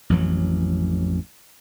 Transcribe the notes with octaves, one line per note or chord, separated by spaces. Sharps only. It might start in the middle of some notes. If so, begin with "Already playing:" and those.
A1 F2 E3 F#3